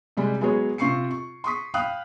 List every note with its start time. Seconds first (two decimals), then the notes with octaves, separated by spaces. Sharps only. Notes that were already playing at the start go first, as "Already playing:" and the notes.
0.17 C3 G3 G#3
0.41 F#3 G#3 B3 G#4 C#5
0.78 C3 C4 F4 C#6 C7 C#7
1.11 C#6
1.44 C6 C#6 D#6 B6
1.74 F5 G5 B5 D#6 F6 F#6